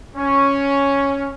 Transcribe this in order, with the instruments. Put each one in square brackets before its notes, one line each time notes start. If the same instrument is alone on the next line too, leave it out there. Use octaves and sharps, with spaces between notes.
[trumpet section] C#4